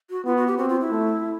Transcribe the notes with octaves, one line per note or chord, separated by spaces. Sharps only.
F#4
B3 F4
F#4
G4
C4 F#4
F4
E4
A3